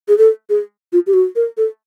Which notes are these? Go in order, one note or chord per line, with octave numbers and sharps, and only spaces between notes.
G#4
A4
G#4
F4
G4
F#4
A#4
A4